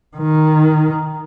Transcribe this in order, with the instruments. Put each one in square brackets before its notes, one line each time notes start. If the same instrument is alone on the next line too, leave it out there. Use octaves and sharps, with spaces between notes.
[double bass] D#3